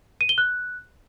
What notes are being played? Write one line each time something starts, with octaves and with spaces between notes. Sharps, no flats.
D#7
G7
F#6